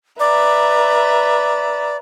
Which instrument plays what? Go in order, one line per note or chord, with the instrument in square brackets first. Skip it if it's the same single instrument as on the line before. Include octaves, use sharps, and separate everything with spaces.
[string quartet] B4 E5 A#5 [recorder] D5